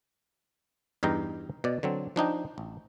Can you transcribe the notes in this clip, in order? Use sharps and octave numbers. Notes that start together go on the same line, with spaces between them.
E2 G2 D#4 G5 A#5
B2 D5
D3 F#3 C4
F3 D4 D#4 G5
A1